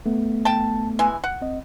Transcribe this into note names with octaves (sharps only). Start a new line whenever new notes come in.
A3 B3
G5 A5
E3 G#3 G#5
F#5
C#2 C4 D#5